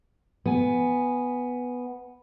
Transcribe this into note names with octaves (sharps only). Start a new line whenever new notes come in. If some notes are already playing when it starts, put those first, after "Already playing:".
B3 G#5